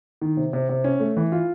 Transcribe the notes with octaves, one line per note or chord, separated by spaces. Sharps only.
D#3
C3
C3
C3
C#4
A3
E3
F4